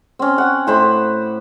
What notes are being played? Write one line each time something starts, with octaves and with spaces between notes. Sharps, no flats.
C4 C#4
F#5
A2 C5 B5 C6